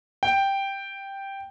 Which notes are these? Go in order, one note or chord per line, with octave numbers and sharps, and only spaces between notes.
G5